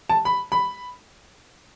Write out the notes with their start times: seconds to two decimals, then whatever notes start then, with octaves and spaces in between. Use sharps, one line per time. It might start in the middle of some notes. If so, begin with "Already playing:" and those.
0.09 A5
0.25 B5
0.52 B5